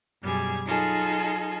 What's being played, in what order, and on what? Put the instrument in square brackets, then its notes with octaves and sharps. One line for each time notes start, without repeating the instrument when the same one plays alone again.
[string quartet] F#2 B2 G3 G#4 G#6
F#3 D#4 F4 G#4 A4